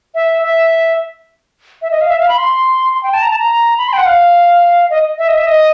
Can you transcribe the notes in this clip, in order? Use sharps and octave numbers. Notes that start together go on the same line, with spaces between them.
E5
E5
E5
D#5
F5
E5
F5
B5
C6
C6
G5
A5
A#5
A5
A#5
B5
C6
G5
F#5
F5
D#5
E5
D#5
E5
D#5